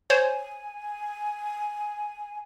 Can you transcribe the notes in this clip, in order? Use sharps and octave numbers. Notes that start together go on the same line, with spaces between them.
C5 C#5 G#5